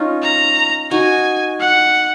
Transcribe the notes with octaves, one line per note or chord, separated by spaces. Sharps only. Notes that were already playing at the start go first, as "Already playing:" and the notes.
Already playing: C#4 D#4 F4
A#5
D#4 F#4 G#5
F#5